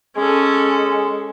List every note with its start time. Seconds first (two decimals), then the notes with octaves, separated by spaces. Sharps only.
0.17 G#3 C#4 A4